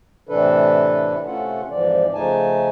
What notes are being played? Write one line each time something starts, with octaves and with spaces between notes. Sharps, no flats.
A2 C3 E3 D4 A4 B4
C3 A3 C#4 F4 A4 F#5
F2 G#2 E3 F3 D5
C#3 F3 A3 D#4 G#5 A5